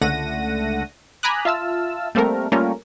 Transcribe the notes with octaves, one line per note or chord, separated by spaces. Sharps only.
C#2 D3 A3 F#5 A#6 D#7
G#5 A#5 B5 D6 D#6 F#6
F4 E5 A5 E6 F6
G3 A3 A#3 C4 A4 A#4
G3 A3 A#3 C#4 F4 A#4